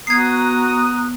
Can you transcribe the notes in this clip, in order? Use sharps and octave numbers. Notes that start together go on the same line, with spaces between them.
B3 F#4 A#5 D#6 F#6 G#6 C7